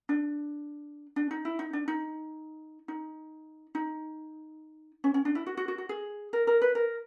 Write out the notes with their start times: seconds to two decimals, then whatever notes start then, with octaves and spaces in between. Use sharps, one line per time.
0.09 D4
1.16 D4
1.31 D#4
1.45 E4
1.59 D#4
1.73 D4
1.88 D#4
2.88 D#4
3.75 D#4
5.04 C#4
5.14 C#4
5.25 D4
5.35 E4
5.47 F#4
5.57 F#4
5.68 F#4
5.78 F#4
5.89 G#4
6.33 A#4
6.47 A#4
6.62 B4
6.75 A#4